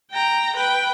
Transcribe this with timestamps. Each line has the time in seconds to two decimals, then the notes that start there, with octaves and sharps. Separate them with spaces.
0.12 G5 A#5
0.55 B4 G5